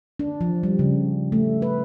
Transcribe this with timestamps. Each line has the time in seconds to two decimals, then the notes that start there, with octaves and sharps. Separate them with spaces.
0.20 D4
0.41 F3
0.63 G3
0.79 C#3
1.32 A3
1.62 B4